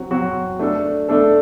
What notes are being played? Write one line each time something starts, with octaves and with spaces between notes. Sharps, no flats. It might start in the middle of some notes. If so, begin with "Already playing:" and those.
Already playing: F#3 C4 F#4
F#3 C4 F#4
A3 D4 A4
A3 D4 A4